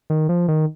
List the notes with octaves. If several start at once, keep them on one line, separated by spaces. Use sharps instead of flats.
D#3
F3
D#3